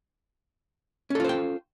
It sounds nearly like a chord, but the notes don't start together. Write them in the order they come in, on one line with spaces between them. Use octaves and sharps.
C#4 A4 F4 C5 G5